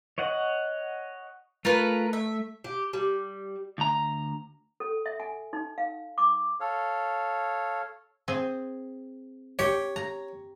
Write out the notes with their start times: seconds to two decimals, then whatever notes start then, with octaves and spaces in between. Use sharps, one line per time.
0.18 C#5 D#5 F#5
1.65 A3 F4 A#4 B4
2.13 E5
2.64 G4
2.93 G3
3.78 D2 A#5
4.80 A4
5.06 E5
5.20 G#5
5.53 D#4
5.78 F5
6.18 D6
6.60 A4 C#5 F5
8.28 C4 G#4
9.59 G4 C#5
9.96 A#5